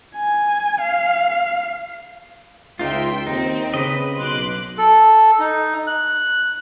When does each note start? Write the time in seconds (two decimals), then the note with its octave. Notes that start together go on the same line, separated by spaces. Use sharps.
0.15 G#5
0.81 F5
2.79 C#2 D#4 F4 E5 G5 C6
3.27 D#2 C4 D#4
3.74 C#3 B4 D#5
4.17 B1 C6 D6 F#6
4.78 A4
5.40 D#4
5.87 F#6